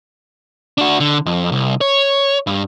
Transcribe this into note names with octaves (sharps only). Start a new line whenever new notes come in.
D4 F#4
D3
F2
C2
C#5
G2